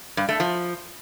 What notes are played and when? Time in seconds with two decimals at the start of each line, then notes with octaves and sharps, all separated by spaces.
0.17 G2
0.29 A3
0.40 F3